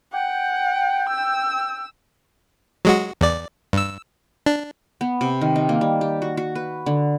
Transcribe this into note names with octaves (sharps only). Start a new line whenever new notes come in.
F#5 G5
E6
F#3 G#3 F#4
E2 D5
G2 E6
D4
B3
C3
D#3
D#4
A#3
G3
G4
F#4
F#4
B4
D3